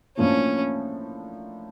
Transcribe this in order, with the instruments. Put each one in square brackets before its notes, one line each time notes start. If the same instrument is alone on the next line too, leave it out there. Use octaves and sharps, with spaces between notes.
[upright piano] A2 F3 A#3 D4 [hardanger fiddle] C#4